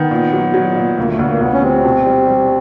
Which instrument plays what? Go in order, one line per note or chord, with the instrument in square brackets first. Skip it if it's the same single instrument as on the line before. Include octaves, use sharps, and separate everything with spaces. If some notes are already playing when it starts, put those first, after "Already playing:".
Already playing: [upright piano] D#3 [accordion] B3
[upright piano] A#2
F#3
F#3
A#2
[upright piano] D2 [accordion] A#3
[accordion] A3
[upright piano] D2 [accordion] B3
[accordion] A#3
[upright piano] D2 [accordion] B3
[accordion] C#4
[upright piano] G3 [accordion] C4
[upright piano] B2
G3
G3